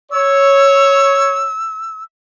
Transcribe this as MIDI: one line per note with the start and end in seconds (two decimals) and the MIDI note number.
0.12 1.48 73
0.12 2.03 88